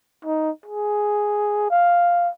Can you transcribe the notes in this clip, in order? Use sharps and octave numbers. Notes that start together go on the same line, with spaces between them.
D#4
G#4
F5